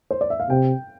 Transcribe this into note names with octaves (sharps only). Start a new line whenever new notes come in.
C5
D5
E5
F5
C3 G5